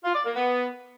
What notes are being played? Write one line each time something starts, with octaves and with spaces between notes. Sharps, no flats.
F4
D5
A#3
B3